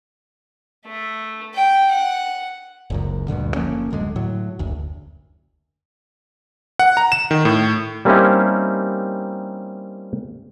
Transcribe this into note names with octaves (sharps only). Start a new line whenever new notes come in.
A3
G5
F#5
F#1 C#2 F#2
D2 G2 A#2 D3
F#1 F3 A#3 C#4
D1 F#2 D3 G#3
A2 F#3
F#1 D2
F#5
A#5
E7
D#3
A2
G3 A#3 C4 C#4 D#4 E4